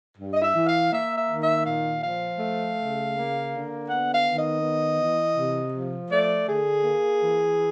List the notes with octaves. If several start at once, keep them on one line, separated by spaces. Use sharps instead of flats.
G2
D#5
E5
E3
F5
A#3 E5
E5
D#3
E5
A#2 F5
F3 F5
A3
C#3
A#3
D3
B3 F#5
F5
D#3
D#5
B3
E3
C3
F3
A3 D5
D3 G#4
A#3
E3